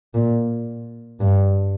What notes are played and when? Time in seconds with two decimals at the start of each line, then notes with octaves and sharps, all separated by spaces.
0.14 A#2
1.20 G2